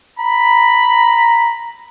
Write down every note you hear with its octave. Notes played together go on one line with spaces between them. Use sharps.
A#5 B5